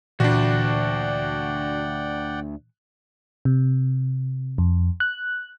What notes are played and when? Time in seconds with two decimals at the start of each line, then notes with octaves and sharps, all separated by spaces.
0.20 D2 A#2 E3 D4 F#4 D5 F#5 G5
3.45 C3
4.58 F2
5.00 F#6